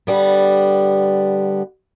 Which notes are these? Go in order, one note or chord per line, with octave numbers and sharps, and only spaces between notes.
D3 G3 B3